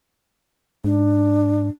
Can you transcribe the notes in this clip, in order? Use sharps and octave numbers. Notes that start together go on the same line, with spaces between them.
G#2 D4